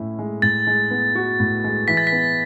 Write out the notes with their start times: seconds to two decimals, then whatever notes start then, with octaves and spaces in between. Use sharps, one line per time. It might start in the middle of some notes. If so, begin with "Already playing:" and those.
Already playing: A2 C#4 E4
0.19 G#3
0.42 A2 A6
0.67 G#3
0.91 B3
1.15 F#4
1.40 A2
1.64 G#3
1.88 E3 B6
1.97 A6
2.07 B6
2.12 B3